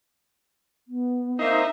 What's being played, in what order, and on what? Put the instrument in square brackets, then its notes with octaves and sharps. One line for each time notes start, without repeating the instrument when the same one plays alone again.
[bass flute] B3
[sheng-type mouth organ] A#3 C4 C5 [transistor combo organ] D#4 [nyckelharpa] E5 A#5